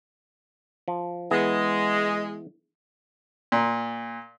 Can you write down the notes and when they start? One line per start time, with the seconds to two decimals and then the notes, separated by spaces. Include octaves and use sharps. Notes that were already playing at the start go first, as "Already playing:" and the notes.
0.88 F3
1.31 E3 G#3 B3 G#4
3.52 A#2